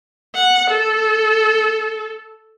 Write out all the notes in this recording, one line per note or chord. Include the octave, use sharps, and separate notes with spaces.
F#5
A4